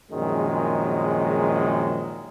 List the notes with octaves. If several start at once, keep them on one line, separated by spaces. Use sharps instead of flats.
A#1 F#2 D#3 G#3